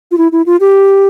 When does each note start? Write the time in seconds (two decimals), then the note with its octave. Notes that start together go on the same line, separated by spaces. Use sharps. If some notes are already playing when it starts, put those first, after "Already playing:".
0.11 F4
0.18 E4
0.32 E4
0.46 F4
0.60 G4